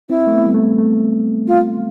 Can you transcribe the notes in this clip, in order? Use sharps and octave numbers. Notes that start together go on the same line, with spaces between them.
C4 E4
A3
B3
G3
A3
A3
F4